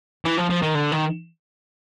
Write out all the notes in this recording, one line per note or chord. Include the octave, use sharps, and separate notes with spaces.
E3
F3
F3
D#3
D3
D#3